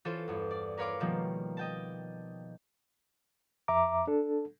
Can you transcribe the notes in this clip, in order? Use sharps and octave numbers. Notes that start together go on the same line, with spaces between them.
E3 C#4 F4 A4 C5 C#5
E2 G2
D5
A#4 B4 C#5 F5 C6 D6
B2 D#3 F3 G3 A#3
D#5 G5 A5
F2 E5 A#5 D6
D4 A4